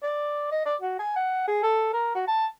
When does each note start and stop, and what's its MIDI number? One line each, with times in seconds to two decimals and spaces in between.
0.03 0.50 74
0.51 0.63 75
0.65 0.76 74
0.81 0.96 66
0.99 1.11 80
1.16 1.45 78
1.47 1.62 68
1.63 1.88 69
1.93 2.12 70
2.15 2.25 66
2.28 2.46 81